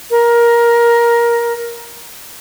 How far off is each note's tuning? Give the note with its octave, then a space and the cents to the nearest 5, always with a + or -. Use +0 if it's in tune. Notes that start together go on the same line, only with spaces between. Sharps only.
A#4 +15